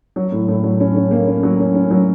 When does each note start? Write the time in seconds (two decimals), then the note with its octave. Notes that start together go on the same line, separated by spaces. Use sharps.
0.16 F#3
0.32 A2
0.48 A2
0.64 F#3
0.80 C#4
0.96 C#4
1.11 A#3
1.27 C#4
1.43 F#3
1.60 C#4
1.75 C#4
1.91 F#3